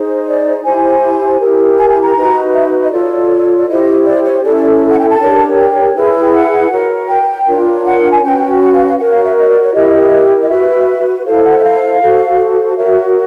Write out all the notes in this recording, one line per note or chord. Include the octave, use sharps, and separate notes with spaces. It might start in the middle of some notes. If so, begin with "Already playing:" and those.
Already playing: D#4 G#4 C5
D5
E4 G4 C5 G#5
E4 G4 A#4
G#5
G#5
A#5
D#4 F#4 B4
E5
D#5
F4 A4 C#5 D5
D5
E4 G4 C5 D#5
D5
C#5
C#4 E4 A4 D5
D5
F#5
G5
A5
D4 G4 A#4 C#5
G5
E4 G#4 B4
G5
F#5
F#4 A#4 C#5
G5
D4 F4 A#4 C#5
F#5
G#5
C#4 F#4 B4 G5
F#5
F5
F5
F#4 A#4 C#5 F#5
F5
E5
D#5
D5
C#5
E4 G4 A#4 D#5
D#5
F#4 B4 E5
E4 A4 C5 F5
F#5
E5
F5
F#4 A4 C5
F#4 A#4 C#5 E5